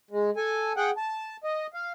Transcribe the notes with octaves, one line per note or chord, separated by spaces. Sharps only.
G#3
A4 G#5
G#4 F#5 G5
A5
D#5
F5